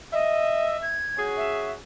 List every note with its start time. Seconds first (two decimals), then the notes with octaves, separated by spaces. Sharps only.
0.13 D#5 E5
0.82 G#6
1.17 C#4 F#4 G#4
1.37 E5